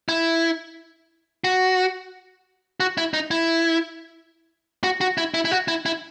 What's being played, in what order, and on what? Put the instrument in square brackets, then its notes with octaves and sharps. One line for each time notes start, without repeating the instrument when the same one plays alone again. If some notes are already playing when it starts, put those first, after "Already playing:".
[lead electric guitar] E4
F#4
F#4
E4
D#4
E4
F#4
F#4
E4
E4
E4
F#4
E4
E4